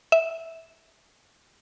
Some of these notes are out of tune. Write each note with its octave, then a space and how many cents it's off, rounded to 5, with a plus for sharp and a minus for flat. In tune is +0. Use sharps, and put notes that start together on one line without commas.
E5 -10